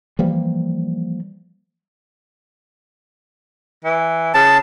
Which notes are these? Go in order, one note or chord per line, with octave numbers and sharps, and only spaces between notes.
E3 F3 G3 A#3
E3
C#3 A5